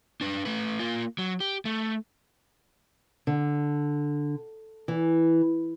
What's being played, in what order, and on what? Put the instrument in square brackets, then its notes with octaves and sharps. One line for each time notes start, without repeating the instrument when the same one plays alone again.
[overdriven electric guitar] D4 B4
A3 B4
A#3 F4
F#3
G4
A3
[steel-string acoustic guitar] D3
E3